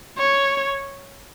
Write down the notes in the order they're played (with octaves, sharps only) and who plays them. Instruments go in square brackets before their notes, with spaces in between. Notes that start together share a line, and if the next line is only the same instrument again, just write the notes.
[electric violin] C#5